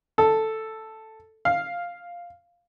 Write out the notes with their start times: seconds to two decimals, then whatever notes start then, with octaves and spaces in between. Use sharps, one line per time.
0.18 A4
1.45 F5